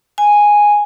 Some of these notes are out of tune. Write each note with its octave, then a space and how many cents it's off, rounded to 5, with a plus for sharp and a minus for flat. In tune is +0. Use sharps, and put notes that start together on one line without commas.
G#5 -5